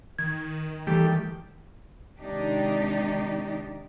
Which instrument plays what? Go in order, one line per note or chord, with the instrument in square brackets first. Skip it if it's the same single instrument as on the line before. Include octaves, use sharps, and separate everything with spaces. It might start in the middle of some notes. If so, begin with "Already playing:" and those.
[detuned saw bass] D#3 [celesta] G#6
[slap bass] E3 [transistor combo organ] G3 A3 G4
[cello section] C3 D#3 G#3 D4 D#4 G4